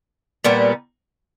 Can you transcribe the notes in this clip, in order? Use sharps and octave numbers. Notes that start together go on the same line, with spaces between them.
A#2 G3 B3